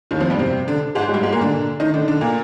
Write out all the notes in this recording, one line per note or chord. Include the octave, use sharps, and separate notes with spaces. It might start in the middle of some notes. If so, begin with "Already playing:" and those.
D#2 D#3
F2 F3
G2 G3
C3 C4
D3 D4
G#2 G#3
G#3
G2 G3
G#2 G#3
A#2 A#3
D3 D4
D#3 D#4
D3 D4
D3 D4
A#2 A#3